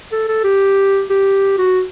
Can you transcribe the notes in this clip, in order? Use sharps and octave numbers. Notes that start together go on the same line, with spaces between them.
A4
A4
G4
G4
F#4